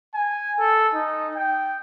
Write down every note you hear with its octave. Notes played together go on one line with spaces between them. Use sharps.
G#5
A4
D#4
G5